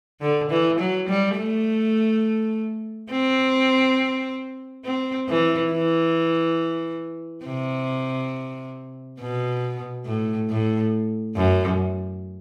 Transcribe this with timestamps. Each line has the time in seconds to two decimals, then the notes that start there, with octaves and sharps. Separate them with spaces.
0.21 D3
0.50 E3
0.79 F#3
1.08 G3
1.37 A3
3.11 C4
4.85 C4
5.28 E3
5.71 E3
7.45 C3
9.20 B2
10.06 A2
10.50 A2
11.36 F#2